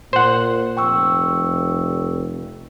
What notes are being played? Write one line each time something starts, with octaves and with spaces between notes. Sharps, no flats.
A#2 C5 F#5
F1 G5 C#6 E6